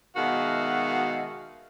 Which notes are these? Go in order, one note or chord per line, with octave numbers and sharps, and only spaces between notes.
B2 D#3 G#3 F#4 E5 F5